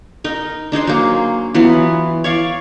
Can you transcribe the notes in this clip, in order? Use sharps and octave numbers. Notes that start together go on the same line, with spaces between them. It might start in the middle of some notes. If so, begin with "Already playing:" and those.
D#4 A#4
D4 D#4 G#4 C5
F#3 A#3
E3 F#3 B3 F4
C#5 D5 F5 C#6